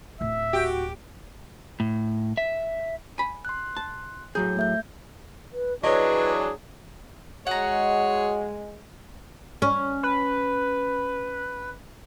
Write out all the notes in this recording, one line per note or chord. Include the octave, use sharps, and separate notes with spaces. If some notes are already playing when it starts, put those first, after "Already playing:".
D1 E5
F#4 G4
A2
E5
G#5 B5
C6 F#6
A5
A2 F#3 G#4 G6
A3 E5 G6
B4
E3 F#3 D4 G#4 B4 C#5 D#5
G#3 F#4 G#4 C#5 F#5 A#5
C#4
B4